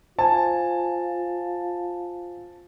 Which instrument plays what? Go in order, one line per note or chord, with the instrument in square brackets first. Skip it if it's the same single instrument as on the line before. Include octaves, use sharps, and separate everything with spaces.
[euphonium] F4 [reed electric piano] C5 G#5 [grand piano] A5